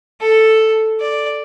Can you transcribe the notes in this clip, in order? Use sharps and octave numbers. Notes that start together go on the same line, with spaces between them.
A4
D5